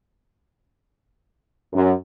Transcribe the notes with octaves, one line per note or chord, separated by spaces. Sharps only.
F#2